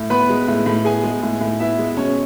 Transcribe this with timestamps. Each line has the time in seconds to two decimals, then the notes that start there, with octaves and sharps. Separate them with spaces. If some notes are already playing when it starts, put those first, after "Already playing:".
Already playing: A2
0.10 B3 B4 B5
0.29 G#3
0.48 A2
0.66 A2
0.85 B3 G#4 G#5
1.03 G#3
1.23 A2
1.41 A2
1.60 B3 E4 E5
1.79 G#3
1.97 B2 C#4 C#5